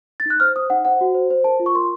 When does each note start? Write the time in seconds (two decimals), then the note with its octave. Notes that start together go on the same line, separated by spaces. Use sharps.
0.20 A6
0.26 D#4 F#6
0.40 C5 F6
0.56 C5 D#6
0.70 D#4 F#5
0.85 C5 F#5
1.01 F#4
1.15 C5
1.30 C5
1.44 A#4 A5
1.60 F4
1.66 C#6
1.75 A#4 C6